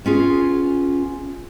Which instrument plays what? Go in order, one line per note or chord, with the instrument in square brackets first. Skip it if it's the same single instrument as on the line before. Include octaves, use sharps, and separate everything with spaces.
[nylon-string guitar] B3 C#4 F4 G#4